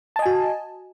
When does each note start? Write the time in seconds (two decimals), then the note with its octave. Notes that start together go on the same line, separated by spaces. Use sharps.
0.16 A5
0.19 D#5
0.22 G#5
0.26 F#4